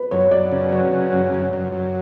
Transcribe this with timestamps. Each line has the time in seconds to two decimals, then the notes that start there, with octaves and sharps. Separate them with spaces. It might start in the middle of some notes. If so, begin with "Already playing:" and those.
Already playing: B4
0.11 F#2 C#5
0.31 F#2 D5
0.52 C#3
0.72 F#3
0.92 C#3
1.12 F#2
1.32 F#2
1.53 F#2
1.72 F#2